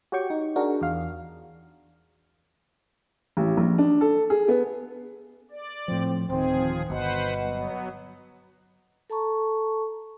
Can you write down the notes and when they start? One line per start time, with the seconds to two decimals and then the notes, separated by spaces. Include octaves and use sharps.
0.12 F#4 G4 C#5 G5 C#6
0.30 D#4
0.56 D4 F#4 G#4 A#4
0.81 E2 F5
3.37 A1
3.57 A#1
3.78 D4
4.01 A4
4.30 G#4
4.48 B3
5.51 D5
5.88 A2 F3 C4
6.30 D1 D#3 F3 C4 G#4
6.90 G1 B2 B4 C5 F#5
7.42 F#3 B3
9.10 A4 A5 A#5 C#6